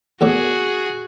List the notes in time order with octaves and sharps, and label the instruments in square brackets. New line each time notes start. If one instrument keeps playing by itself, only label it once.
[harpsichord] E2 A2 A#3 [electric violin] F#4 G#4